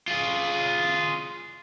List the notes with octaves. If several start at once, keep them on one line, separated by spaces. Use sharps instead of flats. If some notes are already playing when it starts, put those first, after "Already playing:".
F4 G#4